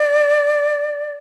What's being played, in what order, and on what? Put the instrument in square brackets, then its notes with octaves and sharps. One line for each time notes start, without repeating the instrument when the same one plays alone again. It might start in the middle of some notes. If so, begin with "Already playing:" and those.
Already playing: [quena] D5